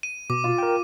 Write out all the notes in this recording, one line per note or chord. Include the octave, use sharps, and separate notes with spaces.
D#7
B2 D6
F4
A#4 G5